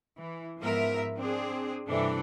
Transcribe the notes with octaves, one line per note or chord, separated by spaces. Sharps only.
E3
G#2 F3 B3 A#4 E5
C4 D4 G#4
G2 C3 E3 D4 A4